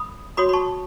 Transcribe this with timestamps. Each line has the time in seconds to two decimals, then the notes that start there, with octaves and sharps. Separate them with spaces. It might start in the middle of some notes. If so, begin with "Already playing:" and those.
Already playing: B5 D#6
0.37 F#4 C#5 B5 D#6
0.49 B5
0.53 A5 C#6